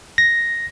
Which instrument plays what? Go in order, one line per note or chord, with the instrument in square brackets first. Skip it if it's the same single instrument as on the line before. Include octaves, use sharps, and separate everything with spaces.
[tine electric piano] A#6